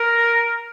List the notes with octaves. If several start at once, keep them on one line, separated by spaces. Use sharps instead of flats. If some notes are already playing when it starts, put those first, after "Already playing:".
Already playing: A#4